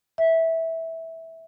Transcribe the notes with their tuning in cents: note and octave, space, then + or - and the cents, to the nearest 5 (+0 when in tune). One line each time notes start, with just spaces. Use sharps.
E5 -15